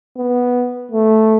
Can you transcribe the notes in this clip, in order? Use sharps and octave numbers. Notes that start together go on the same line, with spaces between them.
B3
A3